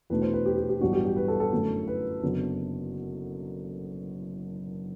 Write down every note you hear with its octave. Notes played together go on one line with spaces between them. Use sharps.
E2 B2 A3 D4 B4
C5
B4
G4
G4
G4
A1 G2 F#3 B3 D4 F#4
G4
G4
B4
A4
A4
F#2 D3 A3
B4
F#1 F#2 D3 F#3 B3